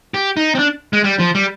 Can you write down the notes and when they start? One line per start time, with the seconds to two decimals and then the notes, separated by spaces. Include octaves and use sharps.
0.14 G4
0.37 D#4
0.55 C4
0.59 D4
0.93 G#3
1.04 G3
1.19 F3
1.35 G3